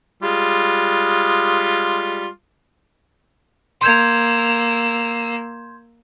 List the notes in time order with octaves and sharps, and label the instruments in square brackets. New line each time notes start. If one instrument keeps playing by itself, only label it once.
[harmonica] G3 G#3 F4
[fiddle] A#3 E6 [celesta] C6 G6 G#6